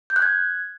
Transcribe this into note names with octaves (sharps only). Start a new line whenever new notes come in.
G6
F#6
G#6